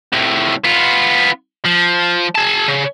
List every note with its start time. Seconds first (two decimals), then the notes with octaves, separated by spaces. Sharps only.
0.13 C2 A2
0.65 B3 F4
1.65 F3
2.35 G#4 A5
2.69 C#3